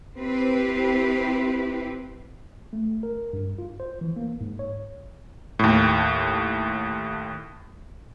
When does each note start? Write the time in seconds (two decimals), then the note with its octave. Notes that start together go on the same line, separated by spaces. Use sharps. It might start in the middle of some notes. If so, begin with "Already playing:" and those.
0.17 C4 E4 G4 B4 C5
2.73 A3
3.03 A#4
3.33 G2
3.58 F4
3.80 C5
4.01 E3
4.17 A#3
4.41 G#2
4.59 C#5
5.59 D#2 A2